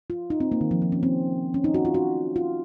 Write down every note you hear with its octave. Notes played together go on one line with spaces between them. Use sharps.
F4
D#4
C4
A#3
D#3
F3
F3
C#4
C4
C#4
D#4
F#4
F4
F#4
F4